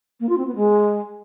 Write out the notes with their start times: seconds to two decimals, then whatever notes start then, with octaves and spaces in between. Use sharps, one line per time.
0.20 A#3
0.29 F4
0.38 C4
0.47 B3
0.56 G#3